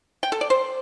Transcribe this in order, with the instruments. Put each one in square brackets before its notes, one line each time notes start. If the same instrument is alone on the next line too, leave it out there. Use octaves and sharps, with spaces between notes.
[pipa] G5
A4
D5
C5